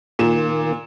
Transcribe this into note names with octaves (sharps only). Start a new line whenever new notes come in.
A#2 D#3 A#3 E7